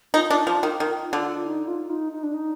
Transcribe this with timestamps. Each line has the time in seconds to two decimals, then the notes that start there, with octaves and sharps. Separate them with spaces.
0.14 D#4 F4
0.30 D4
0.38 D#4
0.46 F3 F4
0.63 D#3 F4
0.80 D#3
1.13 D3
1.46 D#4
1.67 F4
1.90 D#4
2.13 D#4
2.23 D4
2.34 D#4